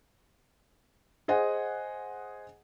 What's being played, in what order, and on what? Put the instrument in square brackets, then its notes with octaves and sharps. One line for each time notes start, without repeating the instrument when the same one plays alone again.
[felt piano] G#4 C5 D#5 F#5 G#5